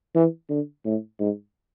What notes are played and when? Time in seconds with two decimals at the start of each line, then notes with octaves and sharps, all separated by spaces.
0.15 E3
0.50 D3
0.86 A2
1.20 G#2